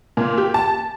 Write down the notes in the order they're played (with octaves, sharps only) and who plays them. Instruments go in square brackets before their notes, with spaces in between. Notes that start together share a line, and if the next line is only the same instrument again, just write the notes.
[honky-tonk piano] A#2
G4
A5